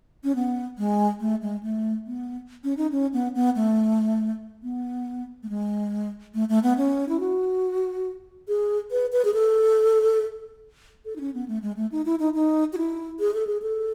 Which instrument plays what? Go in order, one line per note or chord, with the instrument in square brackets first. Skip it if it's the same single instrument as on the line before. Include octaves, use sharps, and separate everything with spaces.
[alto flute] C#4
B3
G#3
A3
G#3
A3
B3
C#4
D#4
C#4
B3
B3
A3
B3
A3
G#3
A3
A3
B3
C#4
E4
F#4
G#4
B4
B4
G#4
A4
A4
D#4
C#4
B3
A3
G#3
A3
D#4
E4
D#4
D#4
F#4
E4
G#4
A4
G#4
A4